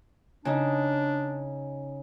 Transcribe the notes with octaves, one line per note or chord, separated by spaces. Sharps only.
C#3 D4 D#4